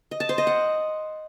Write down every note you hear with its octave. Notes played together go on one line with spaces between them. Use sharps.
D#5
A5
C5
D#5
F#5